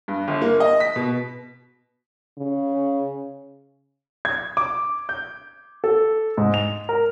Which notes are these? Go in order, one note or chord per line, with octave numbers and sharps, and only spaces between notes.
G2
G1
A#3
D#5
B6
B2
C#3
G#6
D6
G6
A4
G#2
F7
A#4